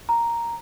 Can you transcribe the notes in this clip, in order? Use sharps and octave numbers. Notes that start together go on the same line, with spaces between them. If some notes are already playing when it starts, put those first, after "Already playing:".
A#5